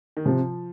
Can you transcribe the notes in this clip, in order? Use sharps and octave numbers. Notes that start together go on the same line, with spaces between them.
D#3
C3 F3